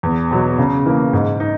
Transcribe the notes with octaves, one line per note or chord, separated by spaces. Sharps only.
E2
B2 F#3
C#3
E3 A#3
G#2
D#4